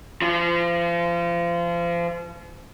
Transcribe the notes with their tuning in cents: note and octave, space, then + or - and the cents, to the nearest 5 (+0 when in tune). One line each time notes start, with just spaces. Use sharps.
F3 -30